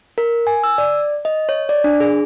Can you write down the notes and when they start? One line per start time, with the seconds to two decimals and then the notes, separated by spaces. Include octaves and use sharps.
0.18 A#4
0.47 G#5
0.64 E6
0.78 D5
1.25 D#5
1.49 C#5
1.69 D5
1.84 D4
2.00 G#4